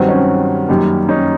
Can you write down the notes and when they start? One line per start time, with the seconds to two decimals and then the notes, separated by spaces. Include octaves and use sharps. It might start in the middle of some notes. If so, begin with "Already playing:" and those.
Already playing: G2 D#3 F#3 C4
0.09 C#4
0.69 F#2 D#3 G3 A#3
1.09 C#4 D#4